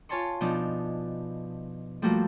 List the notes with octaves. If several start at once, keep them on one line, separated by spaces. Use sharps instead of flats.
F4 C#5 G#5 A5 C6 C#6
B2 F3 D4 D#4
F3 G3 A3 A#3 F#4 A4